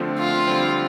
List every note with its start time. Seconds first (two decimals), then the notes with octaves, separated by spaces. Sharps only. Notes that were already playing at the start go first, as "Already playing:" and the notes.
Already playing: D3 F3 A3 C4
0.19 F4
0.47 D3 G3 C4